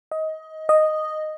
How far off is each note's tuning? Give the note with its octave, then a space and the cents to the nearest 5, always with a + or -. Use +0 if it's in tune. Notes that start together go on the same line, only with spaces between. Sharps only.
D#5 +20
D#5 -5